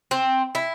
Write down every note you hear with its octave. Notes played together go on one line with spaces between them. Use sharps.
C4
E4